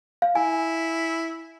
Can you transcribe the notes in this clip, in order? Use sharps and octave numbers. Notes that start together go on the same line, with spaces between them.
F5
E4 G#5